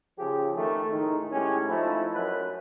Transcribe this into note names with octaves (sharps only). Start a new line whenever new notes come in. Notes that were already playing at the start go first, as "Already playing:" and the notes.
C#3 F3 G4 G#4
F2 D#3 A3
A2 D#3 G#3 D#4
A2 G#3 C#4 G4 G#4
F3 A3 D#4 E4
F#2 B4